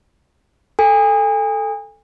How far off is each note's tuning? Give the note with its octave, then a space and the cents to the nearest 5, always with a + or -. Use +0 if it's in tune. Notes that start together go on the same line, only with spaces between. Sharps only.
A4 +0 G#5 -35